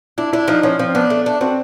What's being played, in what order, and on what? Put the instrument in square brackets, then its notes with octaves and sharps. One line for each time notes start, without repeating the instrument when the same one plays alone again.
[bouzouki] D4 [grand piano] E4
[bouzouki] D4 [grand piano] E4
[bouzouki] F3 [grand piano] D#4
[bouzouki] F3 [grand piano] C#4
[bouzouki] F3 [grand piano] C4
[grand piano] B3 [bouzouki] D4
[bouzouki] A3
D4
[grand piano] C4 [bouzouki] F#4